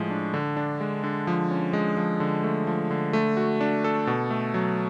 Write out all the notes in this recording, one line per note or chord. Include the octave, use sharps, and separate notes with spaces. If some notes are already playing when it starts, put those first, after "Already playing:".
Already playing: A2 F3 G#3
D4
D3
D4
G#3
D3
F3
C#4
G#3
F3
D3
A3
F3
D3
A3
F#4
D4
A4
B2
A3
F#3